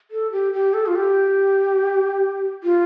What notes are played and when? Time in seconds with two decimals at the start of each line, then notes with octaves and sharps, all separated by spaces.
0.11 A4
0.32 G4
0.53 G4
0.74 A4
0.86 F4
0.96 G4
2.64 F4